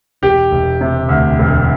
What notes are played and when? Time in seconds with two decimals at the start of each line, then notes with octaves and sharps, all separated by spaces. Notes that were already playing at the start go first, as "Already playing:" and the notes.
0.22 E1 G4
0.51 E1
0.81 C3
1.09 D2
1.39 E1